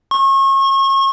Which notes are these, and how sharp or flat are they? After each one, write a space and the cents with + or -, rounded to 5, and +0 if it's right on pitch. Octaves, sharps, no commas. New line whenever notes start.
C#6 -35